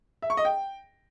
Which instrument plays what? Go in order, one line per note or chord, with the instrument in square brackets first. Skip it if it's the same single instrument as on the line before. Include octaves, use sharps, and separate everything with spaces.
[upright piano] E5
C#6
D#5
G5